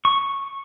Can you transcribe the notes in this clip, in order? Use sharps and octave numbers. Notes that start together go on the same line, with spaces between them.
C#6